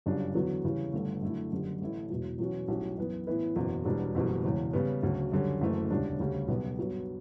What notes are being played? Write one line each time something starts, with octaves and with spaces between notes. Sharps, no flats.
G1 F#2 C#3 G3 D4
E2 D3 F#3 B3
E2 C#3 E3 G3
G1 G2 D3 A3
F#2 D3 A3 E4
F#1 F#2 D3 G3
A1 A2 E3 A3 E4
E1 E2 B2 F#3
E2 B2 F#3 C#4 F#4
B1 A2 G3 C#4 F#4
F#2 E3 B3
A2 E3 B3 E4 B4
F#1 E2 B2 F#3
E1 E2 B2 G3 D4
F#1 E2 B2 G3
E1 E2 C#3
C#3 G3 B3
D2 C#3 F#3
F#2 D3 G3 C#4
F#1 F#2 E3 A3
E1 D2 C#3 G3 D4
D2 C#3 G3
B1 B2 G3 B3
G2 F#3 B3